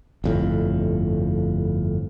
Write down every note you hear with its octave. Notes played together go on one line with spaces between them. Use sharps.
G1 F2 A2